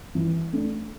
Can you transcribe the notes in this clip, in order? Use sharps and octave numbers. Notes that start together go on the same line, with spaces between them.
E3
A3 D4